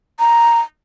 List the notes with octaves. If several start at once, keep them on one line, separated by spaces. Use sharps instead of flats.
A#5